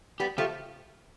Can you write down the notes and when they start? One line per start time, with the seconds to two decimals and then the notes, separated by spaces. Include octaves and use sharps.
0.20 G3 B3 G4
0.38 F3 A3 G4